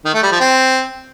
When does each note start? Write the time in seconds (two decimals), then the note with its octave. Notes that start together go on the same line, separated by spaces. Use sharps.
0.05 D#3
0.14 A3
0.23 G3
0.31 F3
0.40 C4